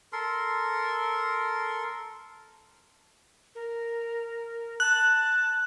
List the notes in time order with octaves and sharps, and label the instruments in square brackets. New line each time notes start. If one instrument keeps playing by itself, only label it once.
[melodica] A4 A#4 C6
[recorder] A#4
[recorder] A5 [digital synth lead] F#6